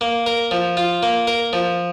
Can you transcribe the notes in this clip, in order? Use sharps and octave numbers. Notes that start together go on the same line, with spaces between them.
A#3
A#4
F3
F4
A#3
A#4
F3